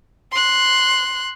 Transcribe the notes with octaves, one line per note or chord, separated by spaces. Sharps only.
C6 F#6